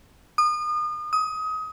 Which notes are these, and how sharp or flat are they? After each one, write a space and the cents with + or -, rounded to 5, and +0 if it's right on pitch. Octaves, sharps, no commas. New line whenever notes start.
D#6 -35
D#6 +25